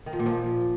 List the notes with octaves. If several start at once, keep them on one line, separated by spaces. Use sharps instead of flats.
D#3
F3
A#2
F3